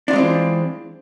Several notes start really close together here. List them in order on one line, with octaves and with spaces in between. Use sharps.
D4 F4 G#3 C4 E3